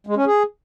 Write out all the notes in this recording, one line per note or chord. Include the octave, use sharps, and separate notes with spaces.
G#3
C#4
G#4